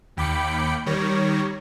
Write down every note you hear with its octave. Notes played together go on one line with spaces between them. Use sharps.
D#2 G5 B5 D6 C#7
D#3 G3 C#5 A#6